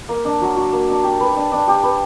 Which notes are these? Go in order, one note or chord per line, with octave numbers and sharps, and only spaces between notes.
A#3
D4
F#3
F#4
A#3
D4
G4
B4
D4
D4
G4
B4